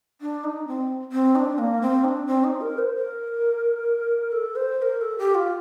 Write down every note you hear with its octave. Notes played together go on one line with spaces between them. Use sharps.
D4
D#4
C4
C4
D#4
D4
A#3
C4
D#4
D4
C4
D#4
A#4
C5
A#4
A4
C5
C5
A#4
A4
G4
F4